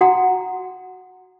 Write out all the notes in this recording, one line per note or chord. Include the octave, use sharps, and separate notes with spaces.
F#4 F#5 G5 A#5